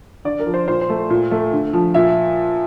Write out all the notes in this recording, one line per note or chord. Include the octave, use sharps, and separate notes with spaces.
D3 D5
A#4
F3
C5
A#2 C5
C5
A3
A#2
A3
D3
F3
A#2 E5